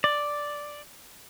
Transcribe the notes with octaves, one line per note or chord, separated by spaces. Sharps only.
D5